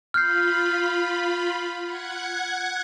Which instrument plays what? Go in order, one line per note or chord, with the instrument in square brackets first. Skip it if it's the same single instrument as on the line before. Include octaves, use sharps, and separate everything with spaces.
[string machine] F4 B5 [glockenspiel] F6 G6 C7
[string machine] F#5 F#6 G#6